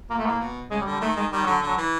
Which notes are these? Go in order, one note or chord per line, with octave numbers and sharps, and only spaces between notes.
A#2 A#3
A3
A2 A#3
B2
C#3 G#3
G3
D3
G3
D#3 A3
D#3 G#3
D#3 G3
D3 F#3
D3 F#3
E3